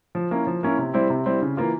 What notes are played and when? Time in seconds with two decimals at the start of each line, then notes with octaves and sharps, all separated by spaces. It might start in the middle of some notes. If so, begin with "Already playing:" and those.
0.15 F3
0.31 A#3 C#4 E4
0.47 F3
0.63 A#3 C#4 E4
0.79 C3
0.94 G3 C4 E4
1.10 C3
1.26 G3 C4 E4
1.42 C#3
1.57 E3 A#3 F4